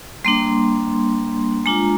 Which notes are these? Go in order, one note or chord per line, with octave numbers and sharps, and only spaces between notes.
G3 A#3 D4 C6
G#3 D4 F4 A#5